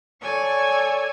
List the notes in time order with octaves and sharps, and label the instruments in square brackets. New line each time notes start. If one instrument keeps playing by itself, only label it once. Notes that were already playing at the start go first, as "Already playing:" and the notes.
[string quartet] A4 C#5 D5 G#5 C#6 E6